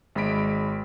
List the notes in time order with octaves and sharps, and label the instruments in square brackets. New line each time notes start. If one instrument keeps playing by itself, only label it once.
[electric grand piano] G#1 G#3 G#4 B5 B6 D7